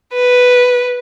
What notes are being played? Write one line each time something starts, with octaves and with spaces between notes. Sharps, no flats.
B4